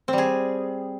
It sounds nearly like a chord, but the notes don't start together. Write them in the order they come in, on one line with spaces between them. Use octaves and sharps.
C4 G3 G#4